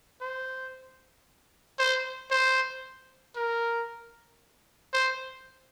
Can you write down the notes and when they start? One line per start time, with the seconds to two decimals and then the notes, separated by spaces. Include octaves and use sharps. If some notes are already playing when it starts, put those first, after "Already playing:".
0.21 C5
1.79 C5
2.31 C5
3.36 A#4
4.93 C5